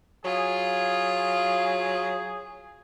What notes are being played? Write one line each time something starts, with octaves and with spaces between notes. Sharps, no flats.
F#3 F4 G#4